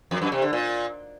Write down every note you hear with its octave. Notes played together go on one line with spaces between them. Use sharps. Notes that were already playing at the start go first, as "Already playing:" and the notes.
F2
F#2
C3
D3
A#2